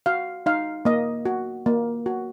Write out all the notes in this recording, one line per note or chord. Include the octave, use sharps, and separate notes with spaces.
F#4 F5
D#4 F5
A#3 D#5
F#4
A#3
F#4